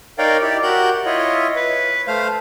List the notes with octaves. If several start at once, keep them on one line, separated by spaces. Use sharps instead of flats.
D#4 A#4 C#5 D5 F5 G5
E4 G4 D5
F#4 G4 A#4 F#5 G6
E4 F4 C#5 D#5
B4
A3 C5 F5